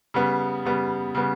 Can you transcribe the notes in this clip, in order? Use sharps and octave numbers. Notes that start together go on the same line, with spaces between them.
C#3 G3 B3
C#3 G3 B3
C#3 G3 B3